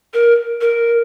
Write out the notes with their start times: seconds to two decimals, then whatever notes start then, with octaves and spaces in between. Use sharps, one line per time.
0.14 A#4
0.61 A#4